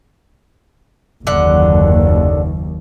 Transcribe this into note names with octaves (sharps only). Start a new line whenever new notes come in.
F#1 D#2 D3 F#5